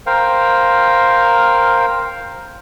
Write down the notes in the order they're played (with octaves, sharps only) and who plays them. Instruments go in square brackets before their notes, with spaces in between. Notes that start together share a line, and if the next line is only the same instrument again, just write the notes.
[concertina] A#4 C5 F5 G5